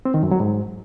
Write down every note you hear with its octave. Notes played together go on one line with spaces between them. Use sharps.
C4
D#3
F#2
F#3
G#2